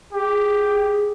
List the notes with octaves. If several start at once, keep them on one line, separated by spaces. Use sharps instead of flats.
G4 G#4